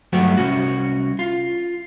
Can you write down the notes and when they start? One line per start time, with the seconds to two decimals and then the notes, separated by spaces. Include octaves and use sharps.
0.13 G2 F#3 A3 B3 F#4 G4
0.37 C2 C#4 F#4
1.19 F4